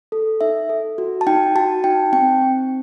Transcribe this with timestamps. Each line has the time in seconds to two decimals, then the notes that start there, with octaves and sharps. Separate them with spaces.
0.12 A4
0.41 D#4 E5
0.70 A4
0.98 F#4
1.21 A5
1.27 D#4 G5
1.56 F#4 A5
1.84 D#4 G5
2.13 C4 G5
2.42 C4